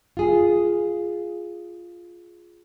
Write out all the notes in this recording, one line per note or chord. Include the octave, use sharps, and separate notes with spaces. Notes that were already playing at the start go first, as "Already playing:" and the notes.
F4 G#4